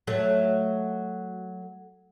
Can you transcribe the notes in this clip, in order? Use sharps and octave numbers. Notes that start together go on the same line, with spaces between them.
F#3 A3